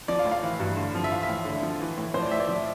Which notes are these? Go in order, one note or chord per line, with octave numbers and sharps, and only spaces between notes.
F3 D5
F5
A2
F5
E3
G2
D3
F3
E5
E3 F5
E5
A2
D3
F3
E3
A2
F3 C5
D5
A2 E5
D5
F3